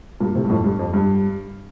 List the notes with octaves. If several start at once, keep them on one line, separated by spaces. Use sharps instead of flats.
G2 A#2
A2 C3
G2
F2 A2
G2
F2
G2